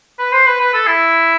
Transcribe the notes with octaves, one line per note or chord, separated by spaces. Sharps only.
B4
C5
B4
B4
A4
E4